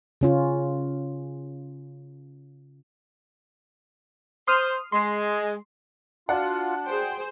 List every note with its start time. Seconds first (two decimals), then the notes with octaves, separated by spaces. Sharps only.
0.21 C#3 C#4 F4
4.47 C5 C6 D#6 F6
4.92 G#3 C6
6.29 D4 F4 F#4 D5 F#5
6.86 G#4 C5 G5